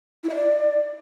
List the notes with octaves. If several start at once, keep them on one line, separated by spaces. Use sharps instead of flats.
E4
E5
D5